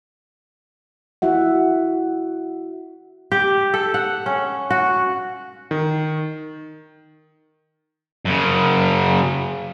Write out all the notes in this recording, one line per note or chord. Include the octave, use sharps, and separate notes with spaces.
E4 F#4 E5 F#5
G4
A4
F#5
C#4
F#4
D#3
F#2 C#3